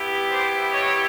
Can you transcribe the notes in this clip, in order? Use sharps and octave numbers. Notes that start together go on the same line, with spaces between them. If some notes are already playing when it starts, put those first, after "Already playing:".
Already playing: B3 E4 G4
C5 D5
C#5 D#5